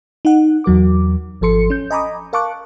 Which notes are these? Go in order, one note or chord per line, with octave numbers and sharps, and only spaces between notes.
D#4 F#5
E2 F#3 A#4 D6
G#1 F3 A4 C6 C#7
C#4 G6
D#5 G#5 A#5 B5 D6 D#6
A#4 F5 A5 C#6 D6 F#6